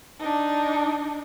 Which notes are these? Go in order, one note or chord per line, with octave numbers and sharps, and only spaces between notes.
D4 D#4